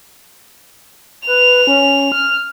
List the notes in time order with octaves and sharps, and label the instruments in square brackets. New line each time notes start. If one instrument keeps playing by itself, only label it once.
[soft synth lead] B4 [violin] F7
[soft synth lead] C#4
F6